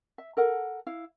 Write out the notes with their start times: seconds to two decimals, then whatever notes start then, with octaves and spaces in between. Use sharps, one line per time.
0.18 E5
0.37 A4 A#4 F#5
0.87 E4 F5